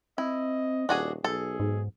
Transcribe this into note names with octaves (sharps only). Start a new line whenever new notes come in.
C4 E4 D#5
D#1 D4 F#4 G#4
B1 G#4 A4
G#2